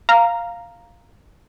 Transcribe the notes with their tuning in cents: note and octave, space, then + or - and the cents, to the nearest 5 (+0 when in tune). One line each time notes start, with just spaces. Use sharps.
F5 +0 A#5 +0